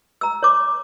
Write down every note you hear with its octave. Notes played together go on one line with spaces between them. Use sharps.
A#5 E6
C#5 D6